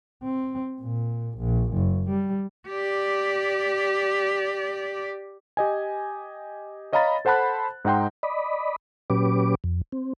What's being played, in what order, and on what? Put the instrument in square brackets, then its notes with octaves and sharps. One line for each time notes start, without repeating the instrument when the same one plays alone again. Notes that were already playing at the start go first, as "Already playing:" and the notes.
[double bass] C4
A#2
A#1
F#1
G3
[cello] G4 D5
[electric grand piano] G4 D#5 G#5
C#5 D#5 F5 A#5 B5 A6
A4 C5 F#5 A5 B5 F#6
G#2 D#4 F#5 G5 C6
[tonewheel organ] D5 D#5 B5
A#2 F#3 C#4 G4 B4 D6
F2
C4